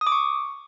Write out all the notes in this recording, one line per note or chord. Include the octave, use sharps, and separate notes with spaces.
D#6
D6
C#6